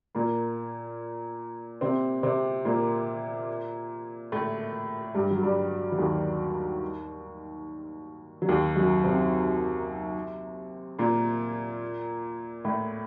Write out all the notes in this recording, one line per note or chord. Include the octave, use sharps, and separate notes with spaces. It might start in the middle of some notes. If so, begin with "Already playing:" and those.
A#2 A#3
C3 C4
C3 C4
A#2 A#3
A2 A3
G2 G3
F#3
G2 G3
F#3
D#2 D#3
F#3
D#2 D#3
F#2 F#3
C3 C4
A#2 A#3
A2 A3